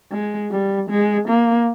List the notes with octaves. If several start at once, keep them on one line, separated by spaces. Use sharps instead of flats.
G#3
G3
G#3
A#3